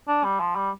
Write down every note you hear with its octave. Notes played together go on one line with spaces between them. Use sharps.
D4
G3
F3
G3